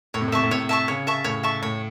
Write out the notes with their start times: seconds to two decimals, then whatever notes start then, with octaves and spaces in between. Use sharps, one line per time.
0.14 A2 C#5
0.21 C3
0.28 A2
0.32 C3 E5 A5 C#6
0.43 A2
0.51 C3 C#5
0.69 E5 A5 C#6
0.88 C#3 C#5
1.07 E5 A5 C#6
1.24 A2 C#5
1.43 E5 A5 C#6
1.62 A2 C#5